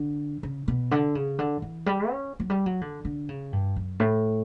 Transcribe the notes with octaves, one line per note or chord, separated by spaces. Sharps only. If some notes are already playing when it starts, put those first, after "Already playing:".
Already playing: D3
C#3
B2
D3
C#3
D3
E3
G3
C#4
F#3
G3
F#3
D3
D3
C#3
G2
F#2
A2